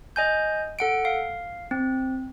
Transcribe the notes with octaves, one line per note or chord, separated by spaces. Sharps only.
D#5 G#5 G6
A4 F#5 D7
F5
C4